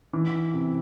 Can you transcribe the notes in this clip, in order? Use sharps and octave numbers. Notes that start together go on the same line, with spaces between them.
E3
C3